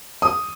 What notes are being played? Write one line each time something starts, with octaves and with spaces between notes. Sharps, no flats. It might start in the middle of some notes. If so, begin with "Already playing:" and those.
D#6